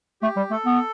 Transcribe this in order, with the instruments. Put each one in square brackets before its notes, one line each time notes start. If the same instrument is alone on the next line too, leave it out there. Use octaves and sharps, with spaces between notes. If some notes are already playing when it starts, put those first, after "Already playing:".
[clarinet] A3 [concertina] G4
[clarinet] G3
[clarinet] A3 [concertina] A4
[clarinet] B3